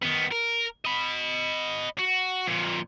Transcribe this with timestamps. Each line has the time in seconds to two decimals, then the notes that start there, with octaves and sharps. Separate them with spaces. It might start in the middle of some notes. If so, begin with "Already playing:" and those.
0.03 D#3 B3
0.32 A#4
0.85 D#5 B5
1.98 F#4
2.47 F2 A#2